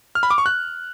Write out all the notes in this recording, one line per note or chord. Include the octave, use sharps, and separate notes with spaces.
F6
B5
D6
C#6
F#6